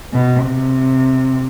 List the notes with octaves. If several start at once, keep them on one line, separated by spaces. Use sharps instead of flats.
B2
C3